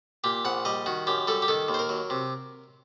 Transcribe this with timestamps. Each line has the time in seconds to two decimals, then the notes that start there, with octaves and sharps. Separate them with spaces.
0.24 A#2 G4
0.45 A#1 F#5
0.65 G3 D#5
0.86 D#3 F#4
1.07 F#2 G4
1.27 G3 A4
1.42 G4
1.48 D#3 A4
1.68 D#2
1.74 C5
1.79 A#4
1.89 F#3
2.10 C3